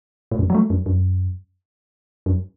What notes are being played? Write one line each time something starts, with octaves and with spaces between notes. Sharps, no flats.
A2
F#2
F#3
A3
F#2
F#2
F#2